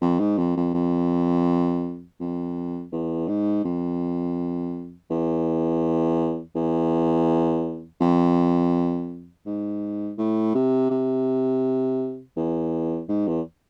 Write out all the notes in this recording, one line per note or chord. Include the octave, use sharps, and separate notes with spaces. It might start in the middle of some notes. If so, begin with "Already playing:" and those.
F2
G#2
F2
F2
F2
F2
E2
G#2
F2
E2
E2
F2
G#2
A2
C3
C3
E2
G#2
E2